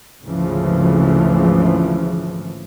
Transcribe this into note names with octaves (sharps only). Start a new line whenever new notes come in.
G#1 D2 C#3 E3 F3